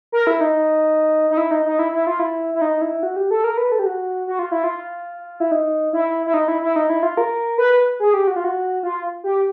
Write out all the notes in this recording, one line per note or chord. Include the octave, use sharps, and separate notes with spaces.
A#4
E4
D#4
D#4
E4
D#4
D#4
E4
E4
F4
E4
E4
D#4
E4
F#4
G4
A4
A#4
B4
A4
G4
F#4
F#4
F4
E4
F4
E4
D#4
E4
E4
D#4
E4
E4
D#4
E4
F4
A#4
B4
G#4
G4
F#4
F4
F#4
F4
G4